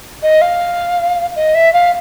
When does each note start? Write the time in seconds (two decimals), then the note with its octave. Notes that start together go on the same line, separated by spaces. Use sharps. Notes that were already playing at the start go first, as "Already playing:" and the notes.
0.23 D#5
0.41 F5
1.36 D#5
1.54 E5
1.73 F5